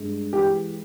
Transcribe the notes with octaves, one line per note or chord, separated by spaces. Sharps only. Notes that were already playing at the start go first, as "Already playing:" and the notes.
Already playing: G2 G#3
E3 G4